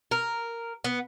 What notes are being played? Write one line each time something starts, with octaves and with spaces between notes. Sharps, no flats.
A#4
B3